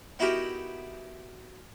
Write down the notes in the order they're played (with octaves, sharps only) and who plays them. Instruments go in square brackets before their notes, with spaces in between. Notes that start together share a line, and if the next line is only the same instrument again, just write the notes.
[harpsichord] B3 D#4 E4 F#4 G4 A#4